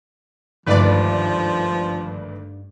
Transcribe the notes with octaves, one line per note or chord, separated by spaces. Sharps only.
G#1 D2 G2 D#3 F3 B4 D5